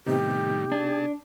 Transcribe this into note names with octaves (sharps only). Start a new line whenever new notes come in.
A2 C3 D#3 G3 B3 D#4 G4
D4 G#4 A5